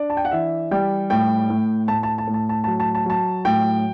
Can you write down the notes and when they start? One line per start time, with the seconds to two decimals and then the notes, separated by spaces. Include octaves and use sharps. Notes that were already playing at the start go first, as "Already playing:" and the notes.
Already playing: D4 D5
0.10 A5
0.17 G5
0.25 F#5
0.32 E3 E5
0.71 G3 G5
1.10 A2 G5
1.50 A2
1.88 A2 A5
2.03 A5
2.18 A5
2.27 A2
2.34 A5
2.49 A5
2.64 A5
2.67 F#3
2.80 A5
2.95 A5
3.06 F#3 A5
3.45 A2 G5